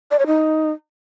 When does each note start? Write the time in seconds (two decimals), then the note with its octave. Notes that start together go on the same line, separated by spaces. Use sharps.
0.11 D5
0.19 C#5
0.27 D#4